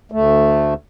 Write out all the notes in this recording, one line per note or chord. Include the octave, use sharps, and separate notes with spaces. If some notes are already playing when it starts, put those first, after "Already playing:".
D2 A3